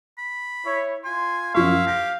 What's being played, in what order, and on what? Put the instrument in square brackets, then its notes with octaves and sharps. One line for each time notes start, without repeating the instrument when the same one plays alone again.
[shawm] B5
[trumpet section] E4 C#5
[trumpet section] F4 C6 [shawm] G#5
[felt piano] F#2 F3 C#6 [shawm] E4 [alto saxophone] F5
[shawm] G4 [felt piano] A#6